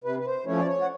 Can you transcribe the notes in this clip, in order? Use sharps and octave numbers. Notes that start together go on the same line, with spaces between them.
C3 B4
B4
C5
F3 A3 C#4 E4 C#5
D5
C#5
F#5